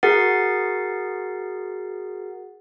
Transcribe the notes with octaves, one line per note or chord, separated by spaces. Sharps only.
F#4 G#4 A#4 F#5 A6 C7